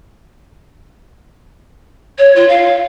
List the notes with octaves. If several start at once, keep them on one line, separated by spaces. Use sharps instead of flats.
C#5
F4
F5